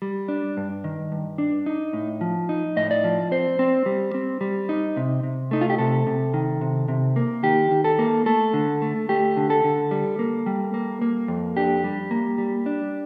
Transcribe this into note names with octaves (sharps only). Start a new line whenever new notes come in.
G3
D4
G2
D#3
G2
D4
D#4
A2
F3
D#4
A2 D#5
D5
F3
C4 C5
C4
G3
C4
G3
D#4
C3
C3
A3 D#4
F4
G4
C3 A4
C3
D#3
C3
C3
A#3
D#3 G4
D#3
A4
A#3
A3 A4
D3
A3
A3 G4
D3
A4
D3
G3
A#3
G3
A#3
A#3
F2
D4 G4
G3
A#3
G3
D4